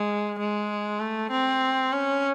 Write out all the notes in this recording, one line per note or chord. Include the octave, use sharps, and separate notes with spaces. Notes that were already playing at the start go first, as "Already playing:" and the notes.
Already playing: G#3
G#3
A3
C4
C#4